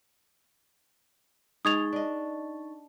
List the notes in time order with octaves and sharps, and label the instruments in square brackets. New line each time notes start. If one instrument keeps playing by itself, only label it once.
[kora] G#3 [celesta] D#4 C#6 A6 [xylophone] D#6 G#6 F7
[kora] D4 D#5